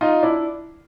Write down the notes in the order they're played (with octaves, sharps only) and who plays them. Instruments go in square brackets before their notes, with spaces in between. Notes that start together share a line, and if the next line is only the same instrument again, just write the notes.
[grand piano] D#4 F4
D4 E4